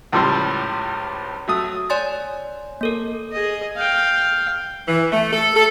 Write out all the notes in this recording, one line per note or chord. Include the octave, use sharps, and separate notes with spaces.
C#2 A2 F3 G3 C5
F#3 A3 D#6
C#5 D5 G#5 C6 A6
A#3 A4 A#4
G#4 D#5
F5 G5
E3
A3
A4
A4